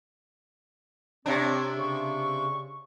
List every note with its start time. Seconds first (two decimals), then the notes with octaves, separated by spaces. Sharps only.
1.26 C3 C4 D4 C#5
1.77 C#3 C#6